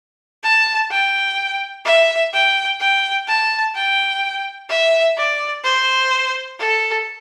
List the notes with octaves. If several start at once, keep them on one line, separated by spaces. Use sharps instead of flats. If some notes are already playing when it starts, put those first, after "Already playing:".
A5
G5
E5
G5
G5
A5
G5
E5
D5
C5
A4